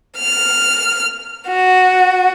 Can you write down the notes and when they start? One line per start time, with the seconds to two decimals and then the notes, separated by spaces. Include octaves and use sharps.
0.18 F6
1.49 F#4